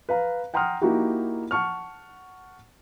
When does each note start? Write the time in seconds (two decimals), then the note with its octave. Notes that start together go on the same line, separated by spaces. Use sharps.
0.09 B4 F5 A#5
0.54 F#5 G5 A#5 C6 D#6 F6
0.81 A#3 D#4 E4 F#4 G4
1.51 F#5 A5 C#6 F6